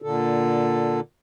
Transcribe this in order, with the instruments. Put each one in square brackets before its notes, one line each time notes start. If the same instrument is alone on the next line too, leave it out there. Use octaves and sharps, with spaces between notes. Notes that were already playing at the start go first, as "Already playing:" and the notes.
[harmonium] A#2 D3 A4